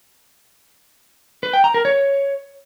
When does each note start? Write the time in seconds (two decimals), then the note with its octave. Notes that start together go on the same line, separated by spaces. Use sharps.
1.43 B4
1.53 G5
1.64 A#5
1.74 A#4
1.85 C#5